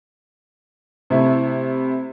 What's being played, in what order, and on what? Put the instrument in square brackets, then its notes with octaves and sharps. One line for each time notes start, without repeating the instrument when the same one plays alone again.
[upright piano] C3 A3 E4